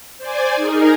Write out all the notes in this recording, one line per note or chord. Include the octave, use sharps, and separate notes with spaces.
C5 D5 G#5
D#4 G#4 A#4